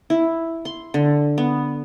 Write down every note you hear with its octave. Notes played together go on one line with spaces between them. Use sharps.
E4
C6
D3
B3